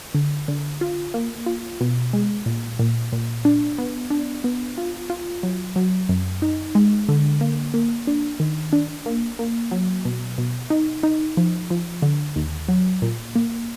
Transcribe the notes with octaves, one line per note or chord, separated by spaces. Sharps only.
D3
D3
F4
A#3
F4
B2
G#3
A#2
A#2
A#2
D4
B3
D4
B3
F4
F4
F#3
F#3
F#2
D#4
G#3
D3
A#3
A#3
D4
D#3
D4
A#3
A#3
F#3
B2
B2
D#4
D#4
F3
F3
D3
D#2
F#3
A#2
A#3